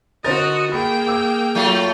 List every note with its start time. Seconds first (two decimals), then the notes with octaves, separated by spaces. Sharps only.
0.24 D3 F#4 A#4 C5 D#5 A6
0.72 A#3 G#4 G5 B5
1.07 D6 E6
1.55 F#3 A3 F4